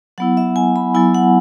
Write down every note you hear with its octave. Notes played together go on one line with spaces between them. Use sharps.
F#3 B3 E4 F#5
E5
G#5
B5
F#3 B3 E4 G#5
F#5